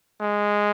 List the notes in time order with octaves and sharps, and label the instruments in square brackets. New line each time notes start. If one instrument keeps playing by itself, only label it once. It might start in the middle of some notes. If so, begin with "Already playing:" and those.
[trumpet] G#3